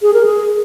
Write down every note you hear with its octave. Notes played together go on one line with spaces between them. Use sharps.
G#4
A#4
G#4